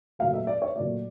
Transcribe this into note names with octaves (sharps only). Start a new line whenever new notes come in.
A#2 F#3 A3 F5
E5
D5
C#5
A#2 F#3 A3 D5